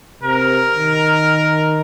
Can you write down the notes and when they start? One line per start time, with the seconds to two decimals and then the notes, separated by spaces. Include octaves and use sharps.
0.23 C3 A#4
0.74 D#3